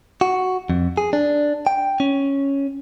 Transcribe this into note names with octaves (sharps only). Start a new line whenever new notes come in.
F#4
F2
G#4
D4
G5
C#4